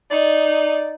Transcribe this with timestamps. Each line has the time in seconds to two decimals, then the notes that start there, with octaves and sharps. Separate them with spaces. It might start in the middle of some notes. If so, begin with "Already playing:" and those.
0.11 D#4 D5